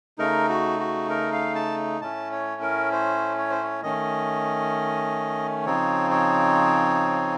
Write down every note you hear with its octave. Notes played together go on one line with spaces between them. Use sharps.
C#3 A3 D#4 A#4
F#4
F#4
A#4
F5
A5
A2 A3 C#4 A5
C#5
A#4
C5
C#5
C5
C#5
D#3 A3 C#4 D#5
C#3 F3 C4 D#4 C#5
C#5